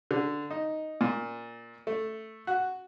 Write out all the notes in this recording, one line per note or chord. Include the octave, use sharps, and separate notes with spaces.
D3
D#4
A#2
A3
F#4